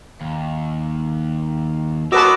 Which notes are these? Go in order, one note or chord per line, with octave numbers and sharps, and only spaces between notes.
D#2
A#3 F#4 A#4 B4 D#5 A5 D6 E6